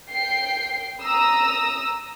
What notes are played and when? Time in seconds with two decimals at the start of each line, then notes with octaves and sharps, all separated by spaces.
0.11 G5 C7
1.03 A#5 D#6 E6